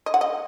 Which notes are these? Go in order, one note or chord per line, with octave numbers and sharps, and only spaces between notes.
D#5
F#5
D#5